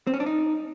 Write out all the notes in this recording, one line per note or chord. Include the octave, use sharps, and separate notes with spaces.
C4
C#4
D4
D#4